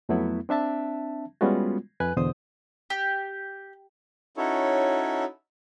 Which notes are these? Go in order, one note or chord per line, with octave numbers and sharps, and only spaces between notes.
F2 F#3 A3 B3 E4
C4 D4 E5 A5
G3 G#3 B3 C#4 F4 F#4
F2 B4 G#5 F#6
E2 B2 D3 C5 D#6
G4
C#4 D#4 E4 F#4 A4 C#5